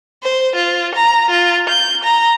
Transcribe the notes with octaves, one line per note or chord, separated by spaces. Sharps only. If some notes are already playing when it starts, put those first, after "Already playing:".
C5
F4
A#5
F4
G6
A#5